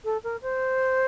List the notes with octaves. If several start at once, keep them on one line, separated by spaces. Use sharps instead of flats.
A4
A#4
C5